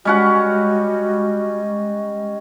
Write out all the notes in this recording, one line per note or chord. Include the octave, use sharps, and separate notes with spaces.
G3 G#3 C#4 F#4 D#5 F#5